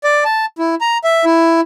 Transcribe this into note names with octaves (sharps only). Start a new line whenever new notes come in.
D5
A5
E4
A#5
E5
E4